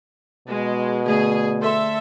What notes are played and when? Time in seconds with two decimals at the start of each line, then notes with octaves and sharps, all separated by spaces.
0.48 B2 G#3
1.06 D3 A3 G#4
1.61 A4 C5 E5 C6